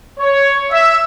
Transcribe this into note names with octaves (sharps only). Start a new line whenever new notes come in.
C#5
E5